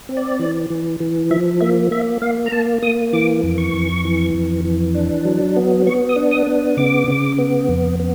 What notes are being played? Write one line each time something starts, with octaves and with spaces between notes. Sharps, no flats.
C4
D5
E3
E3
E3
F3 E5
A#3 E5
A#3 E5
A#3 F5
A#5
A#3 A5
A#3 D#6
E3 D6
F2
C#6
F2
E3
F2
E3
D4
F#3
B3
B3 C#6
D#6
D4
D#6
B3
C#3 D6
C#3
B3
F2
B3